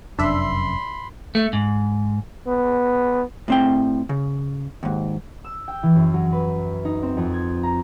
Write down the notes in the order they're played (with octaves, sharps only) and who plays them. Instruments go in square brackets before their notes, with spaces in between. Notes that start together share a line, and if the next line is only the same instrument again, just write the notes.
[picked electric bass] F1 F#2 [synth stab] D4 E5 [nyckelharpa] B5 C6
[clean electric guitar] A3
G#2
[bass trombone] B3
[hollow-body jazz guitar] A2 C4 G5
C#3
D#2 G#2
[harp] E6
G5
E3
F#2
F#3
B4
D#4
C4
F2
G#6
A#5